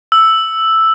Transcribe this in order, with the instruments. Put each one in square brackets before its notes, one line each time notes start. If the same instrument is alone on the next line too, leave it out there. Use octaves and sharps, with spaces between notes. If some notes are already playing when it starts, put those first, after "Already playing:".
[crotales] E6